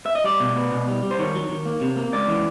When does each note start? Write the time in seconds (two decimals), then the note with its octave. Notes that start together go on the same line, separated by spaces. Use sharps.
0.06 E5
0.15 D#5
0.24 G3 D5
0.40 B2
0.56 B3
0.72 B2
0.88 G3
1.02 G3
1.11 C5
1.19 D#3 C#5
1.35 F#3
1.49 D#3
1.66 A#3
1.81 C3
1.96 A#3
2.13 C#2 D5
2.28 E3